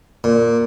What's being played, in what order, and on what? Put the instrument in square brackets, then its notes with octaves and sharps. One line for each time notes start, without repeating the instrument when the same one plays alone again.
[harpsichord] A#2